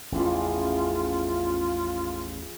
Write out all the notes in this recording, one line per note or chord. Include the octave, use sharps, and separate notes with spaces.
A1 E2 C#3 E3 F3 F4